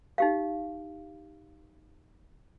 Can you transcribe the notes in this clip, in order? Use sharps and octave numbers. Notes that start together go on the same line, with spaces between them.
D#4 G4 F5